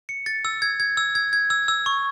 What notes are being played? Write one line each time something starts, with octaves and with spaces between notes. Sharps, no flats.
C#7
A6
E6
G#6
G#6
E6
G#6
G#6
E6
E6
C#6